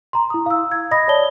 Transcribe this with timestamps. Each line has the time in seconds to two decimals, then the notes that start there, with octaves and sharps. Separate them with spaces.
0.13 A#5 C6
0.30 E4 D#6
0.46 F5 E6
0.72 G#6
0.91 D#5 B5 D#6 A#6
1.08 C#5 D5 A5 G7